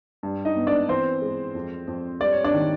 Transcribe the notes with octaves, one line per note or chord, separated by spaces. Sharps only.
G2
D#4 D#5
B3
D4 D5
E3 C4 C5
G#3
F2
F2
G3 D5
C#5
D4 D5
D#3